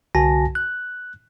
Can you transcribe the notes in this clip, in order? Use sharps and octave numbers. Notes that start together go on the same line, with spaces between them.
C2 D3 F#4 G#5 A5 A#6
F#6